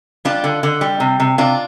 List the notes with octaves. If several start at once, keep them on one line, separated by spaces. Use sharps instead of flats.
G3 D4 F4
D3
D3
G3
C3
C3
C3 D4 F4